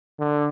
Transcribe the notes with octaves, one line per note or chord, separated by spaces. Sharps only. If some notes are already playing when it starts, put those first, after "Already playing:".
D3